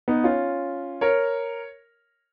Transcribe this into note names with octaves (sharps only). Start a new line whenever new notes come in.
B3 D#4
C#4 F4
A#4 C#5